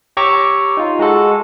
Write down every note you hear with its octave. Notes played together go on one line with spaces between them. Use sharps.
G4 C#5 A#5 C#6 D6 E6
D#4 F4
G#3 F#4 A4